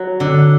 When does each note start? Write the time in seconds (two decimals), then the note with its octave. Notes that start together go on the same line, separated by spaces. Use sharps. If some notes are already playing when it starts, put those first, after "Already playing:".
Already playing: F#3
0.20 D3